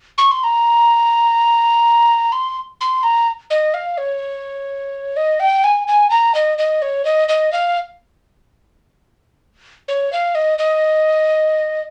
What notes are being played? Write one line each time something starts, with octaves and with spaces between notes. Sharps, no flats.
C#6
C6
A#5
C6
C6
A#5
D#5
F5
C#5
D#5
G5
G#5
G#5
A#5
D#5
D#5
C#5
D#5
D#5
F5
C#5
F5
D#5
D#5